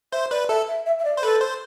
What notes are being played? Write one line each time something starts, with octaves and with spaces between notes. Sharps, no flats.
C5 E5
B4 D5
A4 E5
E5
E5
E5
D5
C5
A4 B4
C5